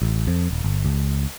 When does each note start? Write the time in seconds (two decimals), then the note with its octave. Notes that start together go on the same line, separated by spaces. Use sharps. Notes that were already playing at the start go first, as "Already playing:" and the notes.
0.02 A1
0.27 F2
0.51 D#1
0.64 G1
0.85 C#2